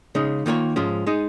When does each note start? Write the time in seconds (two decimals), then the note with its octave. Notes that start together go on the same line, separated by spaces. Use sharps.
0.15 C#3 G#3 D#4
0.46 D#3 A#3 F4 C#5
0.76 G#2 F3 G#3 C#4 F4
1.07 G#3 D#4 G#4